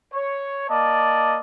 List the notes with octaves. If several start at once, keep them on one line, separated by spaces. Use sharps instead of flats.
C#5
A#3 D5 D#5 A5